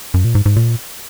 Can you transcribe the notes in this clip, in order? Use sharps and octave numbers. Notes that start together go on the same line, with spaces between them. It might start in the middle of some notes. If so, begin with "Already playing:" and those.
F#2
A#2
G#2
G#2
A#2